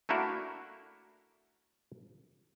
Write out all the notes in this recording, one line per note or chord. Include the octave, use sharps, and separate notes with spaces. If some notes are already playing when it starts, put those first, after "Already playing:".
A3 A#3 D4 E4 F#4 A#4